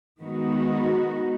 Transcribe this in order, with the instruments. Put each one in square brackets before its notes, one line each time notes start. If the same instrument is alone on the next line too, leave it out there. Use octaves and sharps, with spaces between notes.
[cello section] D#3 G#3 B3 D#4 F#4